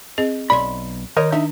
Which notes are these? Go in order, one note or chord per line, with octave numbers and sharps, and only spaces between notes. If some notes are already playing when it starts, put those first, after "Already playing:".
C4 G#4 D#5
B1 D5 B5 C6
D#3 A#4 C#5 D#5
D4 D#4 E5